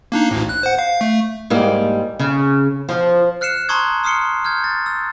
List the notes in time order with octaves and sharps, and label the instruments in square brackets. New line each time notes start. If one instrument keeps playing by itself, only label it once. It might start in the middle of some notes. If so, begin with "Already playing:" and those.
[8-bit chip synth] A#3 D4 D#4
A1 D2 A2
F#6
C5 F#5
F5
A3
[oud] G#2 G3 A#3
C#3
F3
[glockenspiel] F6 F#6 C7 C#7 E7
A5 A#5 C6 C#6 D#6 G#6
C6 D#6 F6 C7 C#7 G7
F6 G6 G#6
A6
E6